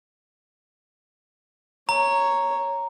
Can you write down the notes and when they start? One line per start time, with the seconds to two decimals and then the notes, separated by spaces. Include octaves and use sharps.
1.89 C#5 A#5